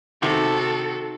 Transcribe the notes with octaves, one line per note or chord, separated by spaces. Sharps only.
C3 D#3 F#4 A4